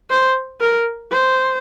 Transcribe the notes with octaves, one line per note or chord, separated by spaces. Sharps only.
C5
A#4
C5